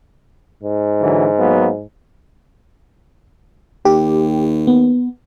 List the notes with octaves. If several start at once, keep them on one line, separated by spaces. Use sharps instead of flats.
G#2
D3 E3 F#3
F#3 A#3 B3
D#2 G4
B3